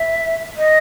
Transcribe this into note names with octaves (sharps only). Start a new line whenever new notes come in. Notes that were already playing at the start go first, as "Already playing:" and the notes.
Already playing: E5
D#5